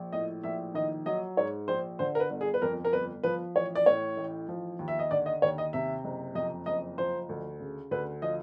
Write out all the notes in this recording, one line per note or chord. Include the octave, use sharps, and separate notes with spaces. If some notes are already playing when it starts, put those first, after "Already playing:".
Already playing: A#1 F3
A2 D#5
A#1 E5
D#3 D#5
F#3 D#5
G#2 C#5
A#1 C5
D3 C5
A#4
B4
G1
G#4
B4
F2 A#4
A#4
G1 B4
F3 B4
A1 C#5
D5
A2 C#5
A1
F3
D#2
E5
D#5
D3 D5
D#5
D#2 C#5
D#5
C3 E5
F#1
F2 D#5
F#1 D#5
F3 C5
D2
C#3
D2 B4
F3 D#5